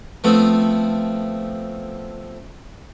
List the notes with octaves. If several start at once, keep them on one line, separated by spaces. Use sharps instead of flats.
F3 A3 B3 C4